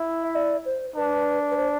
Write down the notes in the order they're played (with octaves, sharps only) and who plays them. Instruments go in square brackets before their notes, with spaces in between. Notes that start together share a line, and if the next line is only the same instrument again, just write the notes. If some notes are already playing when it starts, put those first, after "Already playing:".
Already playing: [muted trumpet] E4
[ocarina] E5
D5
C5
[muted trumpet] D4 [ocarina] B4
[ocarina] B4
C5